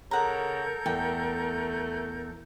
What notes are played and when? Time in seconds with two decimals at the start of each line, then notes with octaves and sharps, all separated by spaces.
0.11 C#3 A4 A#4 F#5 A#5 G6
0.86 E2 A3 G5